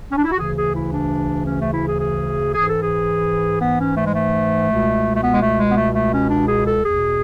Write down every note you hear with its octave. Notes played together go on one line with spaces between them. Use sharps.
C#4
D4
E4
F#4
D2 C#3 E3 G#4
G#4
E4
D4
C#4
A3
E4
G#4
G#4
G#2 E3 G#4
A4
G#4
B3
C#4
A3
G#3
A3
C#2 B2
A3
B3
G#3
A3
G#3
B3
A3
A3
C#4
D4
G#4
A4
E2 B2 G#4